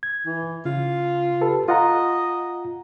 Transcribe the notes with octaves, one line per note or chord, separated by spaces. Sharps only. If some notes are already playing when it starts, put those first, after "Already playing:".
G#6
E3
C#3 F4
G4 A4 B4
F4 D#5 F#5 A#5